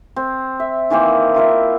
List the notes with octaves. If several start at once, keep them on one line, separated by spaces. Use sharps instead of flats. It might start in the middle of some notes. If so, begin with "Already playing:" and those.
C4
E5
D#3 E3 A#3 C4
E4 F4 A#4 E5